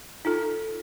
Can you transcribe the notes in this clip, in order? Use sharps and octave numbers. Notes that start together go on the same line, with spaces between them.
D#4 F4 A4